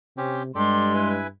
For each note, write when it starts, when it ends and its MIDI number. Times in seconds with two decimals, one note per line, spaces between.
0.17 0.53 48
0.17 0.43 60
0.17 0.43 61
0.17 0.43 67
0.55 1.31 43
0.55 1.19 56
0.55 0.93 67
0.55 0.93 69
0.55 0.93 74
0.55 1.10 84
0.94 1.27 64
0.94 1.27 71
0.94 1.27 80